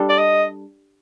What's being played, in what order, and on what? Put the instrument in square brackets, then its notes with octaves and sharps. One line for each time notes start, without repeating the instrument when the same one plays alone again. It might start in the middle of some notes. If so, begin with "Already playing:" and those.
Already playing: [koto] G3 D4 A4
[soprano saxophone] D5
D#5